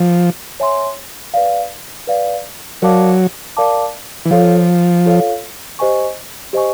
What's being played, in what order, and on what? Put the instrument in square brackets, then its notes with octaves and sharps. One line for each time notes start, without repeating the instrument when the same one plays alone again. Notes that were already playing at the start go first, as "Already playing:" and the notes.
Already playing: [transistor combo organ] F3
[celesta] C#5 E5 G#5 C6
B4 D5 F5
B4 D5 F5
[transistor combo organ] F#3 [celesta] A#4 D5 F5 A5 D6
[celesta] A#4 D5 F5 A5 D6
[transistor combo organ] E3
[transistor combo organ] F3 [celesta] F4 A4 C#5 F5
[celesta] F4 A4 C#5 F5
G4 C5 D#5 G#5 C#6
G4 C5 D#5 G#5 C#6